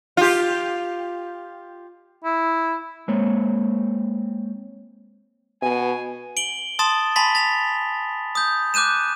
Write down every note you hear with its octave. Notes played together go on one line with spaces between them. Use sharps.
F4 G4
E4
G#3 A#3 C4 C#5
B2 G#5
D7 F#7 G7
A5 C6 D#6 A6 E7
G#5 A5 B5 C6 A6 B6
A6 B6 F7
D#6 G6
D6 F#6 G6 D#7 E7